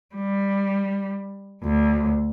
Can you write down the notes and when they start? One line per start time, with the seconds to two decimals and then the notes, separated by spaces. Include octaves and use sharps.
0.15 G3
1.63 D2